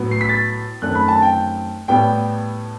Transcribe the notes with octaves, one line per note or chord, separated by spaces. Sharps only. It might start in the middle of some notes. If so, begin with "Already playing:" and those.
Already playing: A2 F#3 B3
C7
B6
A6
F#2 D#3 A3 C4 F#6
B5
A5
G5
A2 G3 B3 G5